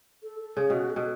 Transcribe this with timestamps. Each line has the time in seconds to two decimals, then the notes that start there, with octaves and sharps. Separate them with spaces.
0.23 A4
0.40 A4
0.57 C#3 G#4
0.70 B2 F#4
0.90 A4
0.96 B2